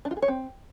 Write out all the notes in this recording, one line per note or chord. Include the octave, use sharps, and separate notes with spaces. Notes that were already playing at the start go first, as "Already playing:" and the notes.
D4
F4
G#4
C#5
C4